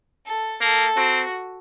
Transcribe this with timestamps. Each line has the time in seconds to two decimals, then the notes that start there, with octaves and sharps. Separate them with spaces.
0.25 A4
0.61 A#3 A4
0.97 C4 F#4